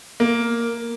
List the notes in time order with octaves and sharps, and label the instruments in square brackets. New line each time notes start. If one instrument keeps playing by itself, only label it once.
[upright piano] A#3